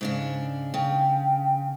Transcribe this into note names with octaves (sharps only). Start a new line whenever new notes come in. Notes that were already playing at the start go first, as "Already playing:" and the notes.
G#2 C#3 D4
C#3 G5